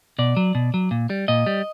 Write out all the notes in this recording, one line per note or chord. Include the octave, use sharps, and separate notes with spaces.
B2 D5
F#3
B2
F#3
A#2
G3
A#2 D#5
G3